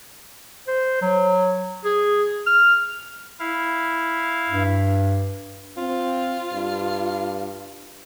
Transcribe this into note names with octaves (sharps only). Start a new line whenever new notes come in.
C5
F#3
G#4
F6
E4 F5
G2
C4 F4
G2